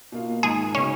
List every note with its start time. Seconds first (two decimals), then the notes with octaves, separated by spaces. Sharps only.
0.12 B2 A#3 F4
0.43 G#2 D#3 G#3 G#4
0.75 C#3 F#3 B3 C#4 D#4